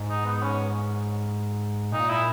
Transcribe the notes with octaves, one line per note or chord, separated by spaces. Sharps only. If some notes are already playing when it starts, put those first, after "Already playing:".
Already playing: G#2
D#4
B3
C#4
A#2 D#4
E4